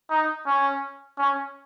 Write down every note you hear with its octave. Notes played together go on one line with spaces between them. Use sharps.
D#4
C#4
C#4